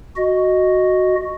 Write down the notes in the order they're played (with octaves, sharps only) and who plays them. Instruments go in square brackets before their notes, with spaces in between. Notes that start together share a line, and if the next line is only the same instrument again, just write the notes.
[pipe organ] F#4 D#5